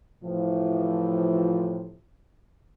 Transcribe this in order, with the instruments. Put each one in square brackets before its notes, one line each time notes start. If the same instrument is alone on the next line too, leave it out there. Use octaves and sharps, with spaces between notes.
[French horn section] A2 C3 E3 F3